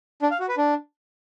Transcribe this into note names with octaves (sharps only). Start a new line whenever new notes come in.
D4
F5
F#4
B4
D4